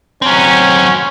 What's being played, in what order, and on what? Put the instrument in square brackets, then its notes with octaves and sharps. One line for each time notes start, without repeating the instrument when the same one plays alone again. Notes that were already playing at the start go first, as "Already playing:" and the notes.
[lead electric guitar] F#3 C4 [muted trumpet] C#4